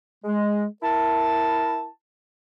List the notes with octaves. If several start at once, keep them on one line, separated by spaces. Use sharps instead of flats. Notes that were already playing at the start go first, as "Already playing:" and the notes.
G#3
E4 A#4 A5